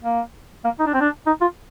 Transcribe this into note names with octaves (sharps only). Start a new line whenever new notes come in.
A#3
A#3
D#4
D4
C4
D4
D#4
F4